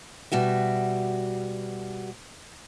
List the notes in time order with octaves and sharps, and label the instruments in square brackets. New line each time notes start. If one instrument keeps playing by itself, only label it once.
[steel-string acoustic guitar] B2 G3 F#4 E5